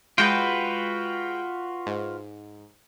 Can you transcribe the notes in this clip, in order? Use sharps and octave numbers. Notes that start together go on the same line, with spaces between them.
G#3 F4 F#4 B4 G5
G#2